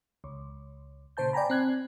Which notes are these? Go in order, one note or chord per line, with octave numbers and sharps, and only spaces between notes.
C#2
A#2 C#3 C5 A5 G6
D5 G5 G#5 A#5 B5
C4 F#6 G#6